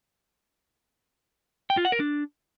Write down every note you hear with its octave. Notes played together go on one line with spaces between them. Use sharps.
G5
F4
F#5
A#4
D4